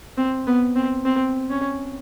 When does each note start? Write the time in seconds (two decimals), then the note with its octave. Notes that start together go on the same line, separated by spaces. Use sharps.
0.18 C4
0.47 B3
0.76 C4
1.05 C4
1.50 C#4